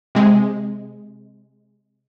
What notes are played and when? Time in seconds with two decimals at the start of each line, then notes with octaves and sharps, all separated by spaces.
0.15 C3 G#3